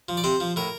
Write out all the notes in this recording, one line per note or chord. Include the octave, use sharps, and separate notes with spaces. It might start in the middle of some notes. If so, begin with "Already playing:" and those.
F3
D5
C3 C5
F3
A2 A#4